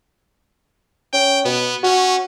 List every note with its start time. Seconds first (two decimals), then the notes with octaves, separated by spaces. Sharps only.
1.13 C#4 G5
1.45 B2 B3
1.83 C#4 F#4